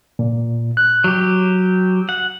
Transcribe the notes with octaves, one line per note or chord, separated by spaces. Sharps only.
A#2
F#6
F#3 G4
F#5